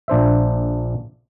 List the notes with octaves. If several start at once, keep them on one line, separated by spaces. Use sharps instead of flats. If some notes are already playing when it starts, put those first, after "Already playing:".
A#1 D4 C5 E5